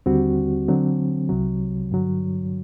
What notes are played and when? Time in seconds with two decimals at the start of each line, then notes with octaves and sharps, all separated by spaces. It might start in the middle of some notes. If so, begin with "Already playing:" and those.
0.06 D#2 D3 G3 C4 F#4
0.68 D3 F#3 C4
1.29 C2 C3 F#3
1.92 G2 D3 F#3